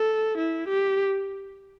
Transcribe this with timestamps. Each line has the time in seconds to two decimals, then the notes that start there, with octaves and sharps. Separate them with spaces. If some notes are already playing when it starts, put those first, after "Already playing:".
Already playing: A4
0.38 E4
0.68 G4